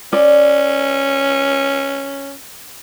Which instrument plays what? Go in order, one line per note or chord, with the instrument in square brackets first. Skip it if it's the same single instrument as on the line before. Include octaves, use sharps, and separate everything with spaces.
[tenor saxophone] C#4 [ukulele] D5